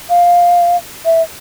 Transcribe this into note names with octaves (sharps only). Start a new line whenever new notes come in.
F5
E5